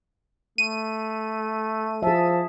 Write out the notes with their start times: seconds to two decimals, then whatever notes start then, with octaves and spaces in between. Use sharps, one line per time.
0.58 A3 D#7
2.03 F3 G#4 E5 A5